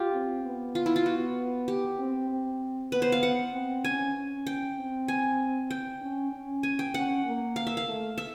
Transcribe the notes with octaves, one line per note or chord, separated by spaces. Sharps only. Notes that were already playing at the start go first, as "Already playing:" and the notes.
Already playing: F4 G4
C4
B3
F4
E4
F4
B3 F#4
G4
C4
C4
B3 B4
C5
F5
F#5
C4
C#4 G#5
C#4
G5
C4
G#5
G5
C#4
C#4
G#5
G5
C#4 F#5
A#3
F5
E5
F5
A3
E5